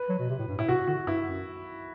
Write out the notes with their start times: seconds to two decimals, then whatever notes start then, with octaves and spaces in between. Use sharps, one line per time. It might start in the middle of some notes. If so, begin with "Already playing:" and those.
Already playing: B4
0.09 F#3
0.19 B2
0.30 C3
0.39 A2
0.49 G2
0.58 A2 E4
0.68 C3 F#4
0.87 D3 F#4
1.07 G2 E4
1.27 F#2